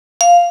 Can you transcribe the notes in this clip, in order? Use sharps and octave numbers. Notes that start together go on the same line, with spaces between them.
F5